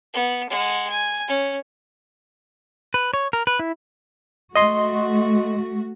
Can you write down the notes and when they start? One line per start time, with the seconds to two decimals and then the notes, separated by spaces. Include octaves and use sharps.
0.14 B3
0.49 G#3 F#5
0.89 G#5
1.28 C#4
2.94 B4
3.14 C#5
3.33 A#4
3.47 B4
3.59 E4
4.56 A3 F#4 D#5 C6